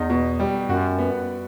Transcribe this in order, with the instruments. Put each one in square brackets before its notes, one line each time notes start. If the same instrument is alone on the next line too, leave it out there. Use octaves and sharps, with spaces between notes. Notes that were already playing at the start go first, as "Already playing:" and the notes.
Already playing: [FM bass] E2 [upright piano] D#4
[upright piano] B2
G3
[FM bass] F#2 [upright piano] F#4
[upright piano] B3